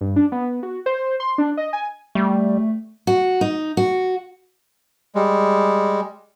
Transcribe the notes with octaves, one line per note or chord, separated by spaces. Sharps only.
G2
D4
B3
F#4
C5
C6
D4
D#5
G#5
G3 A3
F#4
D#4
F#4
G3 G#3